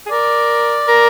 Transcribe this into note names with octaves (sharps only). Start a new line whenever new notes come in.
G#4
A#4 D5
A#4